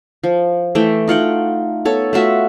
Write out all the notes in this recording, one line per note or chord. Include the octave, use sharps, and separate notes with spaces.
F3
E3 A3 G5
D#4 F4 F#5 G5
B3 A4 C#5
A3 F4 F#4 E5